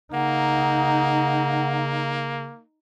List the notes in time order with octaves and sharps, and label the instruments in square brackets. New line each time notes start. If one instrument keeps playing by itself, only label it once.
[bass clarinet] C#3 [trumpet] A#3 [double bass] D#4 [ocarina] F#5